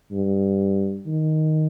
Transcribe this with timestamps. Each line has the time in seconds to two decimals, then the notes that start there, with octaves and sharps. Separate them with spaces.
0.12 G2
1.06 D#3